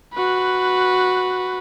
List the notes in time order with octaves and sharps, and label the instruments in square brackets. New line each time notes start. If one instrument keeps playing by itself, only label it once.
[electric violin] F#4 B4